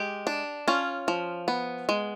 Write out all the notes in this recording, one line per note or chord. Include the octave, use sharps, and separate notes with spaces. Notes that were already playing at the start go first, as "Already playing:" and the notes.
Already playing: G#3 G4
D4
C#4 F4
F3
B3
G#3